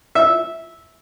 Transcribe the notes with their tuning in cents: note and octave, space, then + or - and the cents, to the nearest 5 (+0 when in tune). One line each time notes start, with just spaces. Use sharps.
E5 -10